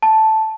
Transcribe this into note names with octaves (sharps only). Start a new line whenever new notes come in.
A5